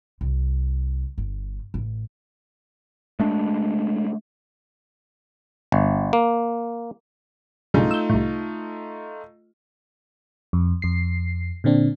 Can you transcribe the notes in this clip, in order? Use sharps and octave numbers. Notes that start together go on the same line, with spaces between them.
C2
G1
A1
G#3 A3 D4
G1
A#3
B1 G2 C#3 A3 D#4 F4
E6 G6
C2 A2
F2
F2 C7
A#2 D3 C4 D4